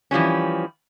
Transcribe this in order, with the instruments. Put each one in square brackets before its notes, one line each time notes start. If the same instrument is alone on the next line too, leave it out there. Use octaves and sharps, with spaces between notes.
[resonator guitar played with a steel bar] E3 F3 G3 C#4